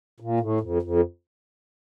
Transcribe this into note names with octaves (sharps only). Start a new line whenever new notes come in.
A#2
A2
F2
F2